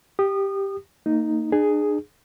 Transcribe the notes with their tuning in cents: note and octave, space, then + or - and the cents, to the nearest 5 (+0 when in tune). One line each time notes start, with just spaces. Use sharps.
G4 +0 D#6 -30
A#3 -35 D#4 +0
D4 +40 G#4 +0